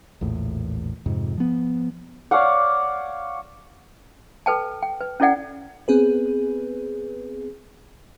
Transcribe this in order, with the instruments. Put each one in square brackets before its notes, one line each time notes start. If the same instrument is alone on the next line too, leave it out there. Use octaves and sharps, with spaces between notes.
[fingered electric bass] A#1 E2 A2
F2 G#2 C3
F3 B3
[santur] C#5 D5 F5 F#5
[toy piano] A4 B4 G5 A5
G5
B4
C#4 E4 A4 D5 F#5 G5
[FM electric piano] B3 C4 G#4 B4